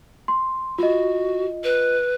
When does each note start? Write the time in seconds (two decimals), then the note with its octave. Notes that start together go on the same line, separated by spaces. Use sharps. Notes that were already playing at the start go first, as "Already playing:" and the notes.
0.28 C6
0.78 F4 F#4 D#5
1.64 B4